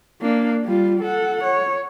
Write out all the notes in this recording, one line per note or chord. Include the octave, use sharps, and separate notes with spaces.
A#3 D4
G3 F4
A4 F#5
C#5